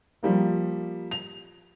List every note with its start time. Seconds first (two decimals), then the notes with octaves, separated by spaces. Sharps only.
0.23 F3 G3 A#3
1.11 F7